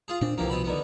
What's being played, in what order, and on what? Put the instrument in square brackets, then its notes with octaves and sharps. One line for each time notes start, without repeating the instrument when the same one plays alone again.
[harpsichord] F4 G#4
[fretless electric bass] A#2 D4 [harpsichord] C4
[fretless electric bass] C2 F3 [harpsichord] C3 E3 A#3
[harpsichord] B2 C4 B5
D3 D#3 B3